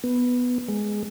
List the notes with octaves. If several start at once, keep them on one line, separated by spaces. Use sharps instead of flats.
B3
G#3